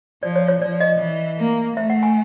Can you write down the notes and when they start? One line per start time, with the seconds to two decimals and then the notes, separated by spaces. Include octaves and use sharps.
0.23 F3 D5
0.36 C#5
0.48 C#5
0.61 F3 D5
0.80 D#5
0.99 E3
1.38 A#3
1.77 A3 E5
1.90 F#5
2.03 G#5